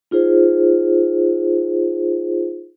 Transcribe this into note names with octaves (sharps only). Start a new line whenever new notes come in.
D#4 F4 G#4 C5